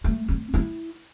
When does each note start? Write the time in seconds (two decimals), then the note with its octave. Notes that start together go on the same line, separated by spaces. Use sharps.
0.04 A3
0.29 C4
0.54 E4